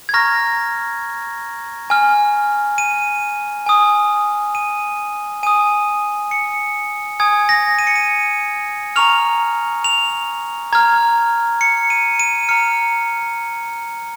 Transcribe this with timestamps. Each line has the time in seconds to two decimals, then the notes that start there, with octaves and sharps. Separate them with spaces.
0.09 G#6
0.14 A#5 C#6 F6 A#6
1.90 G#5 F6
2.78 D#7
3.66 G#5 D#6
4.55 D#7
5.43 G#5 D#6 D#7
6.31 C#7
7.20 G#5 D#6 G#6
7.49 A#6
7.79 D#7
7.87 C#7
7.96 D#7
8.96 A#5 C#6 F6 F7
9.84 F7
10.73 A#5 F6 G#6
11.61 C#7
11.90 D#7
12.19 D#7
12.49 A#5 F6 C#7